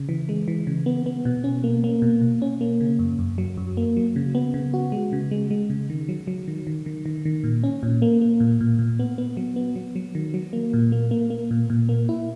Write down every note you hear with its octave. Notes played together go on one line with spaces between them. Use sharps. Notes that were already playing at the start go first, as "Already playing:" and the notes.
Already playing: C#3
E3
G#3
E3
C#3
B3
B3
B2
C#4
A#3
A#3
B2
B2
C#4
A#3
C#3
F#2
F#2
F#3
F#2
A#3
F#3
C#3
B3
C#3
F#4
G#3
C#3
G#3
G#3
C#3
D#3
F#3
F#3
D#3
D#3
D#3
D#3
D#3
A#2
C#4
A#2
A#3
A#3
A#2
A#2
A#2
B3
B3
F#3
B3
F#3
F#3
D#3
F#3
A#3
A#2
A#3
A#3
A#3
A#2
A#2
A#3
E4